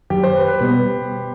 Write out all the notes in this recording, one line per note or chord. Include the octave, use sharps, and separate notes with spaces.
F#2 D#3 F#3 G4
C5
B4
B4
B2 G3 B3